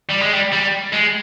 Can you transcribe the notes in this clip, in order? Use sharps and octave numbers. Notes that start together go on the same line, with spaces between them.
G3
G#3
G3
G3
G#3